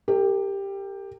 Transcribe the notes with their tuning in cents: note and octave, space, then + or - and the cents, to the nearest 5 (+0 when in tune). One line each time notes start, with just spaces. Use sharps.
G4 +10 A#4 -45